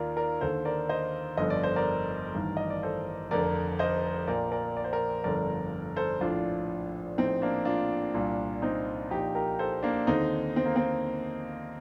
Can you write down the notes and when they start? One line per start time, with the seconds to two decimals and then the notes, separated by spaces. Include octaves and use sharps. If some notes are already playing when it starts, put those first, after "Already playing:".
Already playing: D#2 D#3 F4 A#4 D5
0.17 A#4 D5
0.41 D#2 D3 A4 C5
0.65 A#4 D5
0.89 C5 D#5
1.37 G1 F2 D3 D#5
1.50 D5
1.63 C5
1.76 A#4 D5
2.34 A1 G2 D#3
2.57 D#5
2.70 D5
2.83 A4 C5
3.31 F1 F2 D3 A#4 D5
3.79 C5 D#5
4.27 A#1 A#2 A#4 D5
4.52 A#4 D5
4.77 D5
4.84 C5
4.93 A#4 D5
5.24 G1 F2 D3 A#4 D5
5.96 A4 C5
6.21 A#1 A2 D4 F4
7.18 A#1 A2 C4 D#4
7.42 A#3 D4
7.65 D4 F4
8.14 C2 A#2
8.62 C4 D#4
9.10 A#1 A#2 D#4 G4
9.35 G4 A#4
9.59 A4 C5
9.83 A#3 D4
10.07 D#2 D3 C4 D#4
10.56 C4
10.66 A#3
10.76 C4